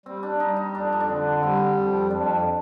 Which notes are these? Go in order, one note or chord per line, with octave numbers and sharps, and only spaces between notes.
G3 C4
D4
G3 D#4
D#4
F2 D4
D#4
D4
D3 C4
G3 C4
F2
F2 D4